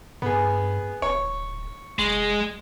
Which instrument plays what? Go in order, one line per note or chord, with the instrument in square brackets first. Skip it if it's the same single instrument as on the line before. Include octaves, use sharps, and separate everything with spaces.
[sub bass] G2 [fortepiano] B3 G#4
[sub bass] D1 [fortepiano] C#5
[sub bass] F1 [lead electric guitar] G#3